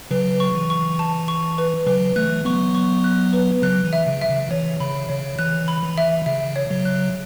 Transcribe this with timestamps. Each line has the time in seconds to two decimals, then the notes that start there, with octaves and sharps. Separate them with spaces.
0.11 C#3 F#3 B4
0.40 C#6
0.55 E3
0.70 C#6
0.99 A5
1.28 C#6
1.58 B4
1.87 C#3 F#3 B4
2.16 E3 A3 F#6
2.45 F#3 B3 C#6
2.75 C#6
3.04 F#6
3.33 B4
3.62 C#3 F#3 F#6
3.85 E3
3.93 E5
4.07 C#3
4.21 E5
4.29 C#3
4.51 E3 C#5
4.80 C#3 B5
5.09 C#3 C#5
5.39 E3 F#6
5.68 B5
5.82 E3
5.98 E5
6.26 C#3 E5
6.56 C#5
6.70 C#3 F#3
6.85 F#6